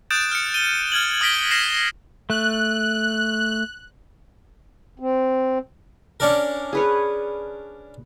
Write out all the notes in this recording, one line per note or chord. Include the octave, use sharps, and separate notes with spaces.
D#6 F#6 G6 A6 D7 E7
F6 C#7
D#7 G7
F6 G#6 F#7
D#6 F6 A#6 B6 D7 G7
F6 A#6 C7 E7
A3 F#6
C4
C#4 D4 A#4
G#4 B4 C#5